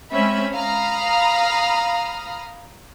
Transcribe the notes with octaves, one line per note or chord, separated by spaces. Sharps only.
G#3 C4 C#4 E5 B5
F5 A#5 B5 D#6 F6